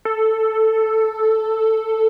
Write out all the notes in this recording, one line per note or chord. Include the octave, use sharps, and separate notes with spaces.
A4